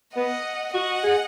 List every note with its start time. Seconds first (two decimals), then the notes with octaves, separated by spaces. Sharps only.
0.16 B3 D#5 F#5
0.74 F#4 D#5 F#5
1.04 G#4